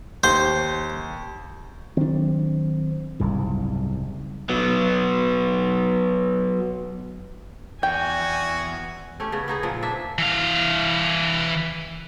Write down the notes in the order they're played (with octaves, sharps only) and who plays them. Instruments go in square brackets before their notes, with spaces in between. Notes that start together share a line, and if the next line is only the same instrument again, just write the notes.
[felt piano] D#2 [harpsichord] C5
[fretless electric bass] D#3 F#3 D4 [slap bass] C4
[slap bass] F#1 C2 G#2 [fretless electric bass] G3
[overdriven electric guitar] F#3 B3
[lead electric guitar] E2 [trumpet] F#4 [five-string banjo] G5 [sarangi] G#5
[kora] A3 C#4 G4
C#3 B3
B3 D#4 G#4
A#2 F3
D4 E5
[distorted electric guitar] E3 F5